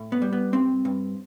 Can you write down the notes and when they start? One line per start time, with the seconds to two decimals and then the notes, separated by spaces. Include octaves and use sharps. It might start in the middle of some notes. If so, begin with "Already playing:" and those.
Already playing: A2
0.12 B3
0.22 G3
0.33 B3
0.53 G2 C4
0.85 G2